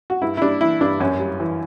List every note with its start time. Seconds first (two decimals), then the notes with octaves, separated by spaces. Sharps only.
0.10 F#4
0.22 G2 E4
0.37 E4
0.42 G3 D4
0.61 E3 E4
0.81 G2 D4
1.00 F#2 C#4
1.19 G3
1.40 E3